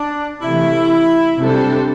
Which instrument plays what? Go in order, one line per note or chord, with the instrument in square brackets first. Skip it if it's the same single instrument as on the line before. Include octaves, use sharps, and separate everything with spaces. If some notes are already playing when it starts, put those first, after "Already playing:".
Already playing: [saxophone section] D4
[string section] C3 E3 A3 [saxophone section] E4
[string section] C3 G3 D4 A4 C5